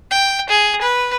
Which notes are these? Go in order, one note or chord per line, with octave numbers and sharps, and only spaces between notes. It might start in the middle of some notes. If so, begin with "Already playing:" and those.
G5
G#4
B4